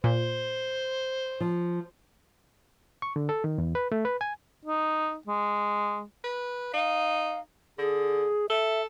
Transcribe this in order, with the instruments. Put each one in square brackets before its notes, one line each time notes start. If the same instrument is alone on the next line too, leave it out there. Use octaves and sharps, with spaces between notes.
[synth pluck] A#2 [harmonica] C5
[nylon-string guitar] F3
[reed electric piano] C#6
D3
A4
D#3
E2
B4
A3
B4
G#5
[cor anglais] D#4
G#3
[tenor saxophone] B4
[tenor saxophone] D#4 [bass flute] F5
[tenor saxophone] D3 [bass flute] G#4
[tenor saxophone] A4 [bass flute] E5